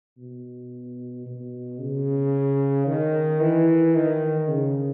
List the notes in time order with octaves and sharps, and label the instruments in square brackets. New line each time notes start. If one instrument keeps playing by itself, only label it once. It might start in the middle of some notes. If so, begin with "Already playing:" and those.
[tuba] B2
B2
C#3
D#3
E3
D#3
C#3